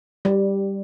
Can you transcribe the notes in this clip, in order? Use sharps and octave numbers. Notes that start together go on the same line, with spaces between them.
G3